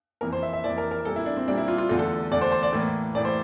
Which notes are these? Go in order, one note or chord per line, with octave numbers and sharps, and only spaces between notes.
F2 E3 A#3 A#4
C5
E5
E5
F2 E3 A#3 D5
A#4
A#4
A#2 G3 A#3 A4
E4
D4
C4
A#2 G3 A#3 D4
E4
F4
F4
E2 D3 A3 F4
A4
E2 D3 A3 D5
C5
C5
D5
A2 E3 A#3
A2 E3 A#3 D5
C5